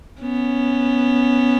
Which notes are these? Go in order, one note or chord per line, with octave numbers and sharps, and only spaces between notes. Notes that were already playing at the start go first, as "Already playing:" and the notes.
B3 C#4